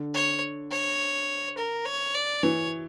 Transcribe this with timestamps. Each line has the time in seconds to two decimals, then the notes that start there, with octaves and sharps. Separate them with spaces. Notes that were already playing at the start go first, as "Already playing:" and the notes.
Already playing: D3
0.14 C#5
0.71 C#5
1.57 A#4
1.86 C#5
2.14 D5
2.43 E3 C#5